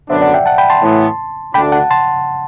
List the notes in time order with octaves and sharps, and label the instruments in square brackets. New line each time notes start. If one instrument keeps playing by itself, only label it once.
[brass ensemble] F#2 D3 F#3 B3 D4 [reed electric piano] C5 E5
[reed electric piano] D5 F#5
E5 G5
F#5 A5
G5 B5
A5 C6
[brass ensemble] A2 E3 B3
[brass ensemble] D2 D3 A3 D4 [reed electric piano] G5 B5
[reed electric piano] F#5 A5
A5 C6